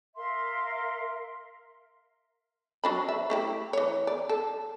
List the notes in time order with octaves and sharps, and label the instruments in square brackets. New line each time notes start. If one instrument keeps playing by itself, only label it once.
[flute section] A#4 E5 F5 C6
[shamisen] F#3 D4 B5
E5
A3 E4 G4
E3 C#5
D5
A4